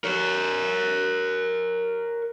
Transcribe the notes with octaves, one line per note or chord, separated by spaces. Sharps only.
A#4 C#5